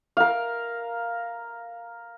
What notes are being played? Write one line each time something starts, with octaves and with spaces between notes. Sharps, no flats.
A#4 F5